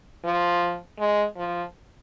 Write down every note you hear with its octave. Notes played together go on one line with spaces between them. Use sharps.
F3
G#3
F3